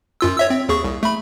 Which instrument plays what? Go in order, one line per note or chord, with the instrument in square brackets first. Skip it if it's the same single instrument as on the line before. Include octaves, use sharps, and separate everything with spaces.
[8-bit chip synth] F#2 F4 E6
C#5 E5 E6
C4
D#2 G#4 C#6
C2
A3 B5